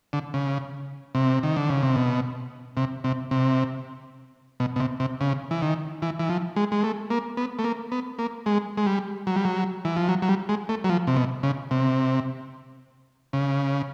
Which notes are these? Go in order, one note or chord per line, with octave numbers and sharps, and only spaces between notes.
D3
C#3
C3
D#3
D3
C#3
C3
B2
C3
C3
C3
B2
B2
C3
C3
C#3
E3
D#3
E3
E3
F3
G#3
G#3
A3
A#3
B3
A3
A#3
B3
A#3
G#3
G#3
G3
F#3
G3
F#3
E3
F3
F#3
F#3
G3
G#3
A3
F#3
F3
C3
B2
C#3
C3
C#3